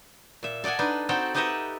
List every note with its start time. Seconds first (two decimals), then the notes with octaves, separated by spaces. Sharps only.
0.43 A#2 E5
0.64 A4 D5 D#5 F#5 G#5
0.79 D4 D#4 B4
1.09 C4 D#4 F#4 A4 F#5 G5
1.34 D#4 G4 B4 D#5 E5 F#5